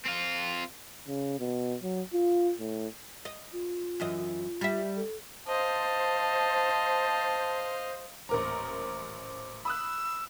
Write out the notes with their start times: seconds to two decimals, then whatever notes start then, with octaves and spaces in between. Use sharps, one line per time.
0.06 C4 F4
1.08 C#3
1.39 B2
1.83 F#3
2.13 F4
2.60 A2
3.25 D#5
3.53 F4
4.00 F#2 E3 D#5
4.61 G3 E5
4.96 A4
5.48 C5 D#5 F5 A5
8.29 D#1 A1 A#4 C5 A#5 D6
9.65 B5 D#6 E6 F#6